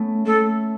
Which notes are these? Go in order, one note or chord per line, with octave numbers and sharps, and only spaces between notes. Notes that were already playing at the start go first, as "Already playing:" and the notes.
Already playing: A3 B3 C#4
A3 A4